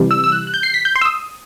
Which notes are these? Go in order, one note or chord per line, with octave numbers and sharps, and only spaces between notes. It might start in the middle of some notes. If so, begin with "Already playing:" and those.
Already playing: C3 E3 G3
E6
E6
F#6
F#6
G6
C7
B6
G6
C6
E6
D#6